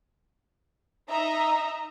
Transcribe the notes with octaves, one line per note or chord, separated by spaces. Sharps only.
D#4 D#5 E5 A#5